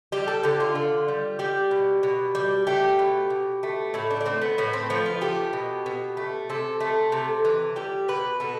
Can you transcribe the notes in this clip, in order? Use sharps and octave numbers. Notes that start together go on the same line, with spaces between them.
G3 G4
A4
D3 G4
F4
D3
G3
G3 G4
B2
B2
G3
A3 G4
B2
B2
A3
A2 E4
D4
D4
A3 C4
B3
A2 B3
C4
F3 B3
F4
A3 G4
B2
B2
A3
C3 A4
A3
C3
E3
G3 G4
B2 B4
B2 A4